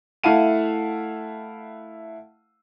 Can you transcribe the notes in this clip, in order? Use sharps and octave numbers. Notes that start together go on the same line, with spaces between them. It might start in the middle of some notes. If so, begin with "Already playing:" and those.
A3 E4 F5 F#5 A5 D#7